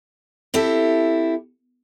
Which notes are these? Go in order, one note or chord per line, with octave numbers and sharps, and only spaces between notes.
C4 E4 G4 A4